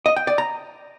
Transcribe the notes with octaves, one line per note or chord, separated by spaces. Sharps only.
D#5
G5
D5
A#5